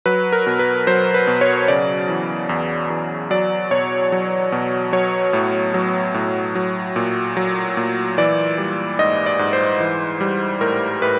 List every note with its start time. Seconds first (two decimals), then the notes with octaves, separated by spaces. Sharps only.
0.06 F#3 B4
0.32 A#4
0.47 B2
0.59 B4
0.87 F#3 C5
1.14 B4
1.27 B2
1.41 C#5
1.68 C#3 D5
2.09 E3
2.49 E2
2.90 E2
3.31 F#3 D5
3.71 B2 C#5
4.12 F#3
4.52 B2
4.93 F#3 C#5
5.33 A2
5.74 F#3
6.14 A2
6.55 F#3
6.96 A#2
7.37 F#3
7.77 A#2
8.18 E3 D5
8.58 G3
8.99 G#2 D#5
9.26 D5
9.39 G#2
9.53 C5
9.80 E3
10.21 G3
10.61 A2 A#4
11.02 A2 B4